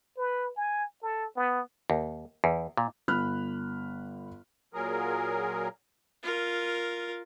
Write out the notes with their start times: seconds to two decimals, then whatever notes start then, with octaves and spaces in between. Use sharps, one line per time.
0.17 B4
0.56 G#5
1.02 A4
1.36 B3
1.90 D#2
2.44 E2
2.77 A#2
3.08 G1 B5 F6 F#6
4.74 A#2 F#3 G#4 A#4
6.23 F4 A#4